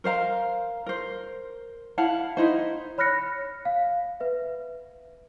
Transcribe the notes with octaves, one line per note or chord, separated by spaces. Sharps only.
A#4 C5 F5 A#5
A#4 C5
E4 F5 F#5 A5
D#4 E4 C5
C#5 B5 F6 F#6 A#6 C#7
F5
B4 E5